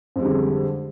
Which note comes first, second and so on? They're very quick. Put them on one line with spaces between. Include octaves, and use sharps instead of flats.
F2 G#3 G3 D3